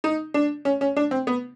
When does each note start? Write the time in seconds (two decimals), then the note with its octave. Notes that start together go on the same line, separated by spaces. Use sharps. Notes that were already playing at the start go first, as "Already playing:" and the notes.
0.04 D#4
0.34 D4
0.65 C#4
0.81 C#4
0.97 D4
1.11 C4
1.27 B3